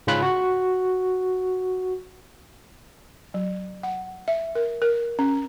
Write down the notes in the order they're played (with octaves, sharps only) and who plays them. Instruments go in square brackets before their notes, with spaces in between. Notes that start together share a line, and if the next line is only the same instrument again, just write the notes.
[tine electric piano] G#2 C#3 C#4 F4 B5 F#6
F#4
[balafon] F#3
F#5
E5
A#4
A#4
C#4